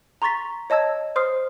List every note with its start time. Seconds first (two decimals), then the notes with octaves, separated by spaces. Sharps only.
0.22 A#5 C6 C#6 A6 B6
0.70 C#5 D#5 A5 E6 G#6
1.16 C5 C6 D#6 F6 C7